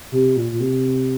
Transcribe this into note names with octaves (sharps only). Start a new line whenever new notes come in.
C3
A#2
A#2
C3